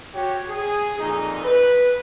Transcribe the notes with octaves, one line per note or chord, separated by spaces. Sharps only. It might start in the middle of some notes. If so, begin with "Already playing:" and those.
F#4 G4 C#5
G#4
F2 A#2 D#4
B4